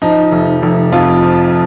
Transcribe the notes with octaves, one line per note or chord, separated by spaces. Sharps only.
F3 D#4
F1
F1
F2 F4
F3